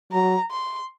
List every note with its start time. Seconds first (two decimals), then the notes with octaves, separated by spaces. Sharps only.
0.12 F#3 A#5
0.51 C6